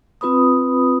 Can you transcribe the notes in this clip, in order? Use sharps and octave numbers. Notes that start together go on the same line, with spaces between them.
C4 F4 B4 B5 D#6